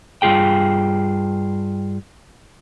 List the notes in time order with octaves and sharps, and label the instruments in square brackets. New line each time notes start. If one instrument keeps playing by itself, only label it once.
[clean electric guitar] G2 F#3 F4 G#4 G5